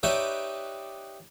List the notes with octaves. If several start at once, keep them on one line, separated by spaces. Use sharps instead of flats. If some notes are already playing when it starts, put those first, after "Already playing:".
D#4 G4 B4 C#5 D5 E5